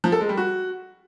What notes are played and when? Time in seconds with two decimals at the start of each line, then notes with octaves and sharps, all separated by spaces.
0.04 F3
0.12 A4
0.21 G#3
0.29 G3
0.37 F#4